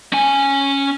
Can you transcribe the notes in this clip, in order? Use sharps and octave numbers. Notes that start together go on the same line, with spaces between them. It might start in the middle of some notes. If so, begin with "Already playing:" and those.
C#4 G#5